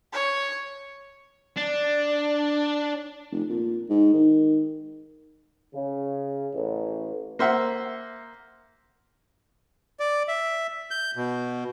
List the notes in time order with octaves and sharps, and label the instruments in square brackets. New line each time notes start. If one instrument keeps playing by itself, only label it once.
[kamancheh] C#5
[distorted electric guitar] D4
[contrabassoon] F1
A#2
G#2
D#3
[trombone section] C#3
A1
[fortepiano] A#3 C5 E5 F#5
[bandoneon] D5
E5
G6
B2